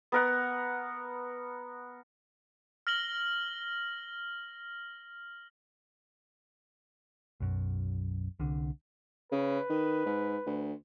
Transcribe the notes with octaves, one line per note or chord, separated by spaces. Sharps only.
B3 A#4 F#5
F6 A#6 F#7 G7
B1 F#2
C2 D3
C#3 B4
D#3
G#2
D2